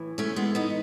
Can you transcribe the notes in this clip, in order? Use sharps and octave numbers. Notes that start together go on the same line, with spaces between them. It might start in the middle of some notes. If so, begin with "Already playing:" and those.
Already playing: A2 E3
A3 C#4
G#3 B3
B3 D#4